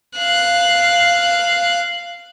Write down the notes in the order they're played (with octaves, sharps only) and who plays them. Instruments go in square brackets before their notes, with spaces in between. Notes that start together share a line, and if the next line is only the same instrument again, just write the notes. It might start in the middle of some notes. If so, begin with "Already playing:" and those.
[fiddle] F5 F#6